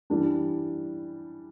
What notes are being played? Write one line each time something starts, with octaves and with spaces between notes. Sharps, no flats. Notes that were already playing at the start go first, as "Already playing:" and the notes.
E3 G3 D4